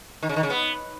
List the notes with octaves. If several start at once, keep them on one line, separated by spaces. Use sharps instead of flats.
D#3
C#3
D#3
C#3
B3